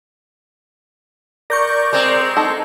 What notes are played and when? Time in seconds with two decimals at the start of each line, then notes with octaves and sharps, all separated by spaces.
1.50 A#4 D5 C#6 G6 A#6
1.93 G#3 C4
2.37 D#4 A4